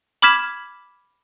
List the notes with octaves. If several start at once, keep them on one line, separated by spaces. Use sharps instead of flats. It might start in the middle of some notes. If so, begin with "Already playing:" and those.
B5 D6 F6 G#6 B6 E7